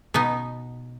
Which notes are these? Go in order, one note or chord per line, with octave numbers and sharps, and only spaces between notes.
B2 B3 D#4